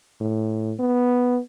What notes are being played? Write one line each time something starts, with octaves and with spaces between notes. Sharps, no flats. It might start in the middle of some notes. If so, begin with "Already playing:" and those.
A2
B3